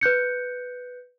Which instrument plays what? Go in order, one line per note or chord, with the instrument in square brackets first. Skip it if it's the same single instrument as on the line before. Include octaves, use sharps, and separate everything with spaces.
[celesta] B4 F#6 G6 C#7